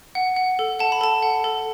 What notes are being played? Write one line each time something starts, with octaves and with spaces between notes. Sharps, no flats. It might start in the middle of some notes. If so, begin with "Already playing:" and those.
F#5
F#5
A4
F#5 A5
B5
A4 A5
F#5
A4